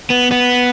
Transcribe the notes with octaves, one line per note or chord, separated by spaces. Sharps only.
B3
B3